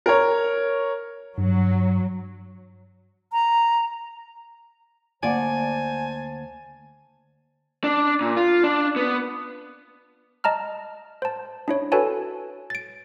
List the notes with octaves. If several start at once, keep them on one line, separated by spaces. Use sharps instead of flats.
A#4 C#5
G2 F#3
A#5
D2 A#3 C5 D5 F#5 G#5 A5
D4
A#2
F4
D4
B3
D#5 A5 A#5 F6
C5 A5
D4 E4 C#5
F#4 A4 B4 C#5 G#5 A5
A6 D7